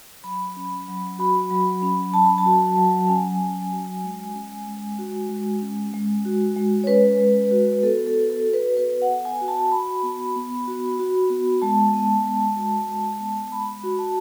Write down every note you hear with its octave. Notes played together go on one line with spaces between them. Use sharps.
F#3 B5
C#4
F#3
F#4 B5
F#3
C#4
F#3 A5
B5
A5
F#4
F#3
C#4 G#5
F#3
F#4
G#3
C#4
G#3
F#4
G#3
C#4
G#3
F#4
G#3
C#5
C#4 B4
G#3
F#4
B3 A4
A4
F#4
A4
F#4
B4
B3 B4
F#5
B3
G#5
F#4
A5
F#4 B5
B3
B3
F#4
F#4
B3
G#3 A5
B3
G#3
F#4
G#3
B3
G#3 B5
F#4
A5